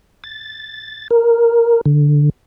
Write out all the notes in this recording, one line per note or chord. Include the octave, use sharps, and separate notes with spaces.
A6
A#4
D3